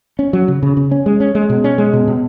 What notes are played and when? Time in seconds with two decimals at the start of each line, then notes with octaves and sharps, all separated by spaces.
0.19 C#4
0.33 F#3
0.48 C#3
0.63 C#3
0.77 C#3
0.91 C#4
1.06 G#3
1.20 C#4
1.35 G#3
1.49 B2
1.64 C#4
1.78 G#3
1.93 B2
2.08 B2